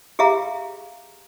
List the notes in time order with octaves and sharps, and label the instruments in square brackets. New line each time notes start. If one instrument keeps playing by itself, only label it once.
[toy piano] G4 G#4 E5 F5 A#5